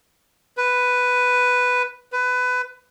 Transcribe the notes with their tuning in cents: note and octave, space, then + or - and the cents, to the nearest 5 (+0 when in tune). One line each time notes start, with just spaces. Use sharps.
B4 +5
B4 +20